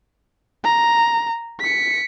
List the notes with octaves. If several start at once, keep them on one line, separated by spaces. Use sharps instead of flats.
A#5
B6 C#7